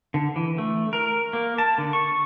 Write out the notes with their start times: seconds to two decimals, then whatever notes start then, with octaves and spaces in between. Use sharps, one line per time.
0.14 D3
0.36 E3
0.58 A3
0.93 A#4
1.33 A#3
1.58 A5
1.78 D3
1.93 C#6